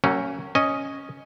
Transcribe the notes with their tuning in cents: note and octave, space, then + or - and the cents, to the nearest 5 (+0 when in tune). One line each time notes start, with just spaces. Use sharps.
F#3 +35 A#3 -30 C#4 +0
C#4 +0 D#5 +0